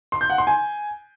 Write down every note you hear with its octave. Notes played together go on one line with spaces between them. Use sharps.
C6
G6
F#5
C6
G#5